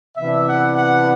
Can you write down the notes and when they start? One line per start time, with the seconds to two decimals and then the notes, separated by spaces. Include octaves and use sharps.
0.17 C3 E3 B3 D4 E5
0.48 F#5
0.78 F#5